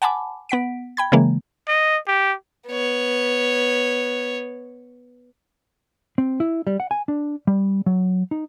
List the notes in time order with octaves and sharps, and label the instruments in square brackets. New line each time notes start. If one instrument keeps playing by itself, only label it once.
[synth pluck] F#5 G#5 A5 B5 D6
B3 F#5 B6 D7
G5 B5 G#6
C#3 E3 G#3 A#3
[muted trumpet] D#5
G4
[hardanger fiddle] B3 C#5
[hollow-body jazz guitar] C4
E4
G3
F#5
G#5
D4
G3
F#3
D#4